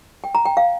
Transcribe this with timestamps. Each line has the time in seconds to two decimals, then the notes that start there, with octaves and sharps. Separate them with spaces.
0.24 G5
0.35 A#5
0.46 G5
0.57 F5